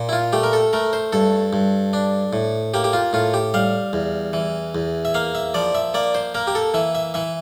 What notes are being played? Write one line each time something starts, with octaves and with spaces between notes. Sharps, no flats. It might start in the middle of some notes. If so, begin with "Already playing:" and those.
Already playing: A#2
E4
F4
A3 G4
A#4
A4
A3 A#4
C5
G2 A4
G2
D4
A2
A#3 G4
G4
F4
A2 F4
G4
G3 F5
E2
E3
E2
E5
A#3 F5
E5
F3 D5
E5
A#3 D5
C5
A#3 A#4
G4
A4
E3 E5
E5
E3 E5